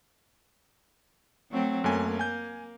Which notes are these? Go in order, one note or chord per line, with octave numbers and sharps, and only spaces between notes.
F#3 A3 C4
F#2 A3 A#3 G#5
G#5 G6